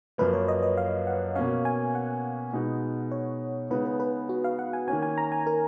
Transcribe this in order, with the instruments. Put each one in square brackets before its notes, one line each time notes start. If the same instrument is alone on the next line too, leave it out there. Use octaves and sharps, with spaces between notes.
[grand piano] F#2 F3 A#3 [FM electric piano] B4
[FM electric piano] C#5
D#5
D#5
F5
F#5
[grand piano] B2 A#3 C#4 [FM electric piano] F5
[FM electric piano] G#5
F#5
[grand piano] B2 G#3 B3 D#4
[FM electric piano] C#5
[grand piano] C#3 G#3 B3 D#4 [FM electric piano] B4
[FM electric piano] B4
B4
F#4
F5
F#5
G#5
[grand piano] D#3 A#3 C#4 [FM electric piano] G#5
[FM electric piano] G#5
A#5
G#5
A#4